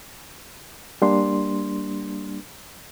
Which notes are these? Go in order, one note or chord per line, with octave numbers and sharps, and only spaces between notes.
G3 A#3 D4 C6